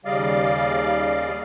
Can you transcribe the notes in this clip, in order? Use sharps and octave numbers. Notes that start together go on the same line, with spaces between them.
D#2 C#3 G3 D5 D#5 F5